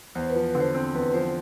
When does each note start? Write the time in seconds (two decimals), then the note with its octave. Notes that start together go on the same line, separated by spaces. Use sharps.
0.15 E2 C5
0.30 B4
0.36 F3
0.45 B4
0.55 D3
0.60 C5
0.75 C4
0.95 E2 B4
1.14 F3 C5